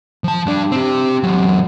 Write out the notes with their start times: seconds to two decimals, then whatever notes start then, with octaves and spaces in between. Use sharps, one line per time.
0.24 F3 A5
0.46 G2 D4
0.72 C4 G4
1.23 E2 F#3